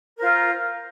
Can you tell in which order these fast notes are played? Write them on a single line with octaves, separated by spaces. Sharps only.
A#4 C5 F4